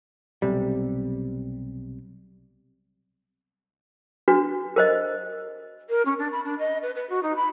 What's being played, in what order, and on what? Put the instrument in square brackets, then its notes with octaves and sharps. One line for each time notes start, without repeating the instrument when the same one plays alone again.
[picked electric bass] B1 C3 G3
[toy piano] D4 F#4 B4
A#4 C5 D#5
[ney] A#4
C#4
D4
B5
D4
D#5
B4
B4
F#4
D#4
B5